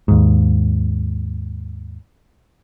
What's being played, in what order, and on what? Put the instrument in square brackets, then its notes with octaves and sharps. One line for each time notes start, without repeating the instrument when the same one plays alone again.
[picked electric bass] D#2 G#2